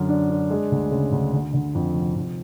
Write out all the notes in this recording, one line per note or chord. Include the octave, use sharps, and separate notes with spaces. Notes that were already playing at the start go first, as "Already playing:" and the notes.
Already playing: F#2 D3
D4
D4
G#3
D2
C#3
D2
D3
D3
F2
F1
F2